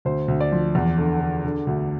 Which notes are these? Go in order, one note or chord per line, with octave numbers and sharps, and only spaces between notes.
D2 C5
D2
D5
F3
E2
D3
D3
D3
D2